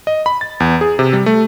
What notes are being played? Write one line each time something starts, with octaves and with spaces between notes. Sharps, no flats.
D#5
B5
A6
E2
G#4
C3
G3
A3